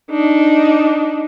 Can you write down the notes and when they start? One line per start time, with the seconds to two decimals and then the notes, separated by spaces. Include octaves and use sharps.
0.10 D4 D#4